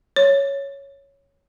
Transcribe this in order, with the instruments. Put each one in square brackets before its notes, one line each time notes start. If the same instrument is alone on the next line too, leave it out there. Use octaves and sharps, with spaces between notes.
[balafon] C#5